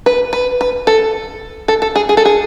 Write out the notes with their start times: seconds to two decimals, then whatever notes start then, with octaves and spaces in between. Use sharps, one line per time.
0.06 B4
0.33 B4
0.61 B4
0.87 A4
1.68 A4
1.82 A4
1.96 G#4
2.09 G#4
2.17 A4
2.25 G#4